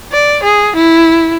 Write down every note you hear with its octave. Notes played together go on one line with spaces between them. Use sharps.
D5
G#4
E4